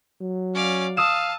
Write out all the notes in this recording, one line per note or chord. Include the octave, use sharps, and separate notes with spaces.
F#3
C#4 D5 F5
F5 A5 D#6 E6 E7